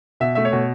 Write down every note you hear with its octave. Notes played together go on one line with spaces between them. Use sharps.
B2 E5
A3 E5
C#5
B2